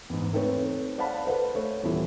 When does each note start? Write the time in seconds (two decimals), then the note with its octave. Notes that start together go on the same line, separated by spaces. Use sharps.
0.10 E2 G#2
0.33 A3 C4 D#4 A4 B4 C#5
0.98 C5 D5 F5 F#5 A5 B5
1.26 A4 B4 C5 F#5
1.55 A3 C#5
1.83 D#1 E2 E4